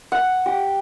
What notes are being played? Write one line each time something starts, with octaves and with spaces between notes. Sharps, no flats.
F#5
G4